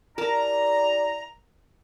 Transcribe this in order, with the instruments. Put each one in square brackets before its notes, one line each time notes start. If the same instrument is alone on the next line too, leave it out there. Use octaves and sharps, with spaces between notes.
[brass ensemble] E4 G4 D5 [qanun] A#4 A5 [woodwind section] A#5